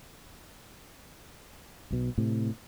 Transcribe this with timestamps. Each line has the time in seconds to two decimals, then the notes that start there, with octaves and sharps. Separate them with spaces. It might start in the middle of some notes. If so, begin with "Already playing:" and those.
1.91 B1 B2
2.18 A2 C3